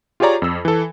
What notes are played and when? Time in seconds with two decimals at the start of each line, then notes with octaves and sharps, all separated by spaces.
0.20 F4 G4 G#4 C#5 D5 A#5
0.42 F2 E6
0.65 E3 A4